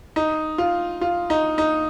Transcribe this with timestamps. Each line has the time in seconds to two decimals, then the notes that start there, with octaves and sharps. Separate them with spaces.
0.16 D#4
0.58 F4
1.01 F4
1.30 D#4
1.58 D#4